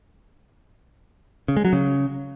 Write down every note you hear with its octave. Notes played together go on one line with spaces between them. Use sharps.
C#3
G#3
F#3
C#3